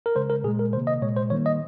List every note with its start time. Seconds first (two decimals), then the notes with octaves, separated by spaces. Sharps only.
0.06 A#4
0.15 C#3 G#3 C5
0.30 A#4
0.44 A#2 G#4
0.48 G#3
0.59 A#4
0.73 C3 D#3 A#3 C5
0.87 D#5
1.02 A#2 G#3 C#5
1.16 C5
1.30 D#3 G3 A#3 C#5
1.46 D#5